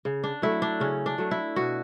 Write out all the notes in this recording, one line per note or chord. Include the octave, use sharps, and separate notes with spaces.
C#3
D4
F#3 A3 E4
D4
C#3 C#4
D4
F#3 A3
E4
B2 F#4